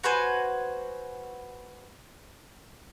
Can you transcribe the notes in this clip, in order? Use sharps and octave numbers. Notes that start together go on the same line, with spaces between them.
F#4 B4 C5 G#5